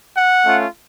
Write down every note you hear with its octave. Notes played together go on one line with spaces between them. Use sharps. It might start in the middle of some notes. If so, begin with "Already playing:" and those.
F#5
A3 C#4 F4